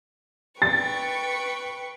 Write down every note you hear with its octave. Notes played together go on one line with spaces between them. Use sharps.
B4 G5 C#6 A6